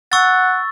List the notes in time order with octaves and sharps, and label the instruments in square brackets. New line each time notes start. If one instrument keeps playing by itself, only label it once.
[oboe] F#5 [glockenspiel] C#6 E6 A6